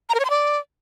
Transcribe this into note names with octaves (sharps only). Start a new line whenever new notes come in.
A#5
A#4
C#5
C6
D5